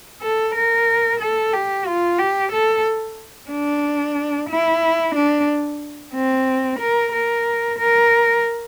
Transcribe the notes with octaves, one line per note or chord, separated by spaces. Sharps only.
A4
A#4
A4
G4
F4
G4
A4
D4
E4
D4
C4
A#4
A#4
A#4